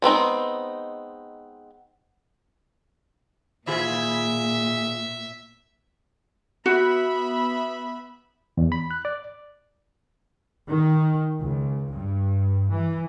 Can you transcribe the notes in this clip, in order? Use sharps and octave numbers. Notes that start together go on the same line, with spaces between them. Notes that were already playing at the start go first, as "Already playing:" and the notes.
G#3 B3 C4 D#4
A#2 D#3 F4 G#4 E5
B3 F#4 E5 B5
E2
B5
F#6
D5
D#3
C#2
G2
E3